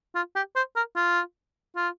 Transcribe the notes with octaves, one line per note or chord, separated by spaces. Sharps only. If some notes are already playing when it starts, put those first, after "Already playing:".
F4
G4
C5
A#4
F4
F4